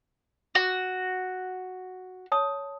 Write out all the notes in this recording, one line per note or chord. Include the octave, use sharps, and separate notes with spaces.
F#4
C#5 A5 D#6